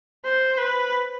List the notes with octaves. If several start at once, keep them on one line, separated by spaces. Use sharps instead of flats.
C5
B4